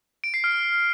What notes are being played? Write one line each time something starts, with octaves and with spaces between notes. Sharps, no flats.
D7
C7
F6